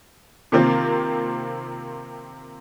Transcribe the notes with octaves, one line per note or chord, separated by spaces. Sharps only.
C3 D#3 A#3 C4 F4